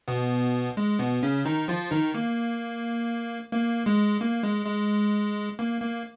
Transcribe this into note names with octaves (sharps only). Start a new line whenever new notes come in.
B2 B3
G#3
B2 B3
C#3 C#4
D#3 D#4
F3 F4
D#3 D#4
A#3
A#3
G#3
A#3
G#3
G#3
A#3
A#3